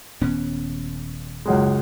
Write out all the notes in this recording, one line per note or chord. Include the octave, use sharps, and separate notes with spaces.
D#1 B3 C#4
C#2 F#2 G#3